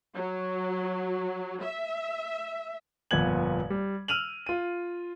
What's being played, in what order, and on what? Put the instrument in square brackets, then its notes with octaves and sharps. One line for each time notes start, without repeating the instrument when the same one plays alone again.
[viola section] F#3
E5
[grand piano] G1 F2 A#2 B3 G#6 F#7
G3
E6 F6 D#7 F7 F#7
F4 D#7